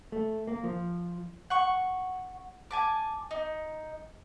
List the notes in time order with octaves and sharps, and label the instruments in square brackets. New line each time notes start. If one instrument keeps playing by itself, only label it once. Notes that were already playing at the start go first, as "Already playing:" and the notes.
[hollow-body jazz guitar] A3
A#3
F3
[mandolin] F#5 C#6
G#5 A5 D6
D#4